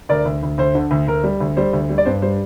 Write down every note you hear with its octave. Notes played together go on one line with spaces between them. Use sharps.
D2 A#4 D5
D2
D2
D2 C5
D3
D2
D2 A#4
G3
D2
G3 C5
D2
G3
D5
G2 C5
G3 C5